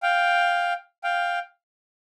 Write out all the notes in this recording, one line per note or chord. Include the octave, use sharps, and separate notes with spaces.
F5 G5
F5 G5